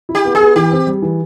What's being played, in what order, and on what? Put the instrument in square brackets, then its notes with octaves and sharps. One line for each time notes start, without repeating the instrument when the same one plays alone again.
[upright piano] E4
[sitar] G4
[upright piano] B3
[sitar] G#4
[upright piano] B3
[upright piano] E3 [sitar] G4
[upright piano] C4
G3
E3